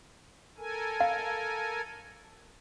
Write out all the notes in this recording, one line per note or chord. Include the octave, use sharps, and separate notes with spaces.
A4 A#4 G#5
F5